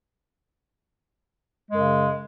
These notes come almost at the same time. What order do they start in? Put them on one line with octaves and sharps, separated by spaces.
G#3 F#2 C#3